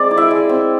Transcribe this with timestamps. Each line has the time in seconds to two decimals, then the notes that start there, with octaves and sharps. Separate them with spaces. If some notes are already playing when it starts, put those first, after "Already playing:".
Already playing: G#3 C4 D5
0.11 E4
0.17 E5
0.31 G#3
0.49 C4